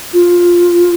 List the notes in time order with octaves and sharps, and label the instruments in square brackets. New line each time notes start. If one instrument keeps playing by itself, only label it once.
[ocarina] F4